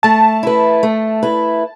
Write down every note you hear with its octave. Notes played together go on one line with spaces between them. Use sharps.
A3 A5
E4 B4
A3
E4 B4